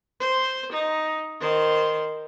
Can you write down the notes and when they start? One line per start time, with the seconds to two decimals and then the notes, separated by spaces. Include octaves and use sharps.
0.20 C5
0.72 D#4
1.41 D#3 C5